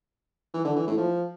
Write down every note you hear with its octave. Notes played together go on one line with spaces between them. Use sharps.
E3
D3
E3
A2
F3